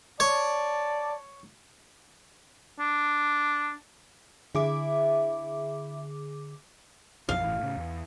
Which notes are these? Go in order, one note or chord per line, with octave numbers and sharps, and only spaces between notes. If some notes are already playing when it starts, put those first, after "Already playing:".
C#5 D5 A5
D4
D3 E4 G#4 E5 D6
B1 F#2 F3 F5
G1 A2 E3
A2 C#3
E2